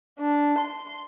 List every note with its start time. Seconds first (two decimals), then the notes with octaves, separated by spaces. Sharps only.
0.19 D4
0.59 C6